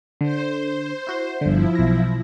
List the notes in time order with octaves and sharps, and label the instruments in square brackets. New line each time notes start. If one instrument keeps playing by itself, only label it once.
[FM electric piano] D3 [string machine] C5
[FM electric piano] E4 F#4 C6
[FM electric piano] G1 D3 [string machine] F3 E4
[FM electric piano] B1 A#6